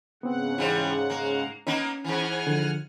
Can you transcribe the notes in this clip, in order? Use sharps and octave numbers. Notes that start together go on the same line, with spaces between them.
G#2 C#3 B3 C4 F#5
E3 G3 C4 D#4
A#3
A#3 B3 C#4 D#4
G#2 E3 F#5 G#5 F6
D3 F3